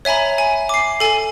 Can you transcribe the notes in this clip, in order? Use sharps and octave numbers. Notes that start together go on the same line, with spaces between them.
C#5 E5 G#5 A#5 B5
G#5
D6 C7
A4 G#5